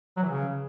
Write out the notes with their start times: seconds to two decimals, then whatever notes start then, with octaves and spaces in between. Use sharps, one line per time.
0.17 F#3
0.23 E3
0.29 C#3